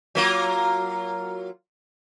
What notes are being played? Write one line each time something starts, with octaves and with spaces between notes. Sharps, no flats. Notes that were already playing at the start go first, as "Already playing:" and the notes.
F#3 A#3 F4